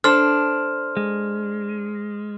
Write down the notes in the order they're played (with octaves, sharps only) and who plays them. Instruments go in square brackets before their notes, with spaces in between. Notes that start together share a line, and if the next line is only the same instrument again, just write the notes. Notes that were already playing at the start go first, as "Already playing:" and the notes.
[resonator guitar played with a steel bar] D4 A4 [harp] C5 [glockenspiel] C6 F6
[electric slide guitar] G#3